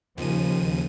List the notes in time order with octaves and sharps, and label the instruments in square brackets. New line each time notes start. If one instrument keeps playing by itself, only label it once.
[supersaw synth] D#2 D#7 [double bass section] C#3 F3